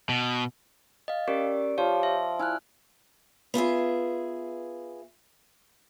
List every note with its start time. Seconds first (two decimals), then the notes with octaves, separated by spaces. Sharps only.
0.09 B2
1.08 D#5 F5
1.28 C#4 G4 A#4 D5
1.78 F3 G4 C#5 F5
2.03 E5
2.39 E4 G#5 F6 F#6
3.54 B3 F4 G#4 E5